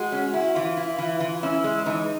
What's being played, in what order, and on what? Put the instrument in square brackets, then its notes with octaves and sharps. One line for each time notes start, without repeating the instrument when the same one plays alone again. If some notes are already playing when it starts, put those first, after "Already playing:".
Already playing: [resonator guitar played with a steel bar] G#3 [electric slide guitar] F#4
[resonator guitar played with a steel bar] C#4
E4
[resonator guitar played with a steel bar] E3 [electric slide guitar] F4
[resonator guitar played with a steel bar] E4
E3
E3
[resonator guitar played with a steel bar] C#4 [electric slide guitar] E4
[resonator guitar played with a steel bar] G#3
[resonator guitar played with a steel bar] E3 [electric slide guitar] D#4